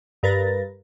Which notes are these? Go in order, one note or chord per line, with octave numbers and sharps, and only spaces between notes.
G2 A#4 B4 A6 A#6